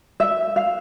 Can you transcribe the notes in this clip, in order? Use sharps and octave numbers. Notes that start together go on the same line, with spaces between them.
E5
F5